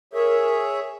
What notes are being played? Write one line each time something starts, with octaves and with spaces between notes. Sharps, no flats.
G#4 A#4 C#5 E5